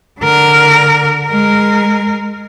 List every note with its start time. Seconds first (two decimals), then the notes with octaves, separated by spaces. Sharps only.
0.20 D3 A#4
1.26 G#3 A#4